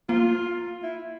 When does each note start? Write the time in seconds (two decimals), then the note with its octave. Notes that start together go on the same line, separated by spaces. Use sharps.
0.09 A#3 F4
0.83 E4